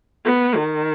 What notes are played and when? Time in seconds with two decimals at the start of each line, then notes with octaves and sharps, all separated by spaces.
0.25 B3
0.56 D#3